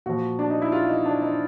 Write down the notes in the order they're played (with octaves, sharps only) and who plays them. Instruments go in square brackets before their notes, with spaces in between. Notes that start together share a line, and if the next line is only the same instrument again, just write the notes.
[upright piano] A#2 F3 F#4
D4
D#4
E4
F4
D#4
D4
D#4